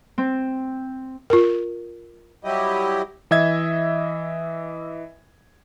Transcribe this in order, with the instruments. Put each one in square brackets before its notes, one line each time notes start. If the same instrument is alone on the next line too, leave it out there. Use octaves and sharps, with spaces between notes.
[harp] C4
[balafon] F4 A#4
[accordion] F#3 G3 E4 G4 D#5
[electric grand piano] E3 D#5 E5 G#6